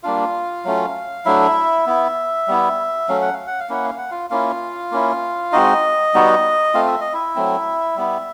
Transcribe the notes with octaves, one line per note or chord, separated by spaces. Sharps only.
G3 A#3 D4 F4 F5
F#3 A3 C#4 F4
F#3 A3 D4 E4 E5
B3 E4
G3 B3 E4
F#3 A3 C#4 F5
F#5
F5
F#5
F5
A#3 C#4 E4 F#5
F5
F#5
F4 F5
A#3 C#4 E4 F4 F5
A#3 C#4 E4
G#3 C4 D#4 F#4 D#5
G3 B3 D#4 F#4
A3 C4 F4 F5
E5
D#5
E4 E5
F#3 A3 C4
G3 B3 E4